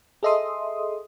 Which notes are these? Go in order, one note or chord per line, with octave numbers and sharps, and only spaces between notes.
G#4 A4 D#5 E5 C6 D#6